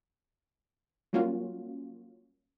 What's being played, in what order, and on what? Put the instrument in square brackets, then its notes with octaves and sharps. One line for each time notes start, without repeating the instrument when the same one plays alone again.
[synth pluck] F#3 G3 A#3 C#4 F4 F#4